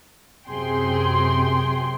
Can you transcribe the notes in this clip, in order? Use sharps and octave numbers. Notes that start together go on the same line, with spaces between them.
F#2 C3 G#4 G5 C6